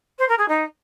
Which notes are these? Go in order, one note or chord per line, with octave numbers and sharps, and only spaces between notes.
C5
A#4
G#4
D#4